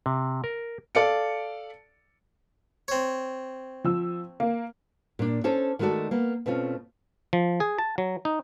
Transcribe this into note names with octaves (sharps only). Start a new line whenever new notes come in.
C3
A#4
A4 D5 F5 C#7
C4 C#5
F3 E6
A#3
A#2 D4
C#4 D4 A4 C5 C#5
D#3 G#3 A3 F#4 A4 D5
A#3 B3
B2 A3 C4 C#4 F4
F3
G#4
A5
F#3
D#4